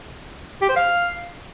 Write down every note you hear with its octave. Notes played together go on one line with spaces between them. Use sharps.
G4
C5
F5